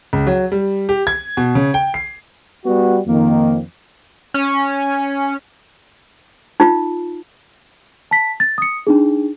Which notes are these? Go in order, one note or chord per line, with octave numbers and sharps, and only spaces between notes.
C#2
F#3
G3
G4
G#6
B2
C#3
G5
C7
G3 B3 F#4
F2 D#3 A#3
C#4
D#4 F4
A5 B6
A6
D#6 C#7
D4 D#4 G#4